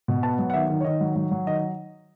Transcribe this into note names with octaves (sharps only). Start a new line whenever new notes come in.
B2
B3 A5
F#3
F#5
D#3 E5
D#3
C#5
D#3 D#5
F#3
F#3
F#3
D#3 D#5